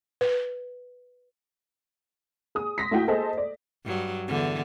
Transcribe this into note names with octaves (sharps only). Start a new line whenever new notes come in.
B4
G#4 D#6
C6 A#6 B6
A3 E4 F#4 G5
G#4 A4 C5 D#5
D5
G2 F#3
E2 D3